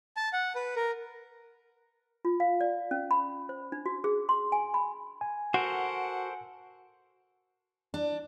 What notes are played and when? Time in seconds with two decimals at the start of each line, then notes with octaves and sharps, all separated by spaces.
0.17 A5
0.33 F#5
0.55 B4
0.76 A#4
2.25 F4
2.40 F5
2.61 D5
2.91 C#4
3.11 B5
3.49 C5
3.72 D4
3.86 F#4
4.04 G#4
4.29 C6
4.52 G#5
4.74 B5
5.21 G#5
5.54 F#4 A4 A#4 C5 F#5
7.94 D4